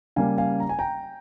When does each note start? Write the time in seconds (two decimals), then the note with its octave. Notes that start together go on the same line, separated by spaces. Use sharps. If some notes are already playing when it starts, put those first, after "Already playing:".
0.16 C#3 G3 A#3 F5 G#5
0.38 F5 G#5
0.60 A#5
0.69 G#5
0.79 G5 A#5